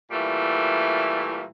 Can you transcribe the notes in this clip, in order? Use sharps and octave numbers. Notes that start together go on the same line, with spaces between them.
A#2 E3 G3 A3